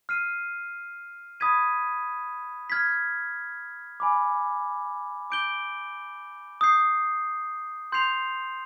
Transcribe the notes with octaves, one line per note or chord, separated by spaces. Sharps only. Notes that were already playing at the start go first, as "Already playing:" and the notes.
F6 C7 D#7
B5 D#6 G#6 B6 D#7
F6 G#6 B6
G#5 B5 D6
D6 G6 D7 G7
D#6 G6 C7
C6 G6 C7 F7